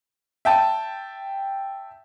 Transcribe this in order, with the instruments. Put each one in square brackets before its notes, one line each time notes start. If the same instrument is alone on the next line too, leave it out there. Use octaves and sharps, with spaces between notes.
[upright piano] E5 G5 A5